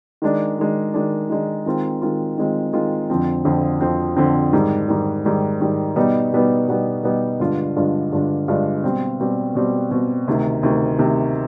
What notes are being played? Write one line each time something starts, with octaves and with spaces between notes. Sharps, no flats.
D#3 G#3 D4
D#3 G#3 D4
D#3 G#3 D4
D#3 G#3 D4
D#3 G#3 C4 F4
D#3 G#3 C4 F4
D#3 G#3 C4 F4
D#3 G#3 C4 F4
F2 D3 F3 C4
F2 D3 F3 C4
F2 D3 F3 C4
F2 D3 F3 C4
G#2 D#3 G3
G#2 D#3 G3
G#2 D#3 G3
G#2 D#3 G3
B2 G3 B3 D#4 B4
B2 G3 B3 D#4 B4
B2 G3 B3 D#4 B4
B2 G3 B3 D#4 B4
G2 D3 G#3 D4 F4
G2 D3 G#3 D4 F4
G2 D3 G#3 D4 F4
G2 D3 G#3 D4 F4
B2 G3 C4
B2 G3 C4
B2 G3 C4
B2 G3 C4
D2 C3 D#3
D2 C3 D#3
D2 C3 D#3